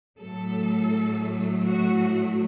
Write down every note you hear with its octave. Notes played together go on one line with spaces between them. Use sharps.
A2 F#3 A3 A4
F#4